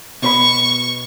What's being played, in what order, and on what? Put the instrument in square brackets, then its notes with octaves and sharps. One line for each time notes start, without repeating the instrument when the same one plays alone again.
[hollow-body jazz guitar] B2 C5 B5 [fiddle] C#6